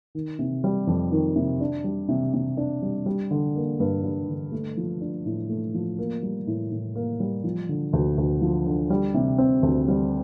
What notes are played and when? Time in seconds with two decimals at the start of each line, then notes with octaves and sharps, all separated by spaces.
0.15 D#3
0.39 C3
0.64 G3
0.87 F2
1.12 D#3
1.36 C3
1.61 D4
1.84 G3
2.09 C3
2.34 C3
2.57 D4
2.82 G3
3.06 G3
3.31 D3
3.56 A#3
3.80 G2
4.03 G3
4.28 D3
4.52 A3
4.77 F3
5.01 D4
5.26 A2
5.49 A3
5.74 F3
5.99 A#3
6.23 G3
6.47 A2
6.71 A2
6.95 A#3
7.20 G3
7.44 F3
7.69 D3
7.93 D2
8.18 D2
8.42 F3
8.67 D3
8.90 G3
9.14 C3
9.38 C4
9.63 D2
9.88 G3